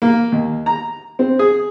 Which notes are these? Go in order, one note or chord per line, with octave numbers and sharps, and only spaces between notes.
A#3
D#2
A#5
C4
G#4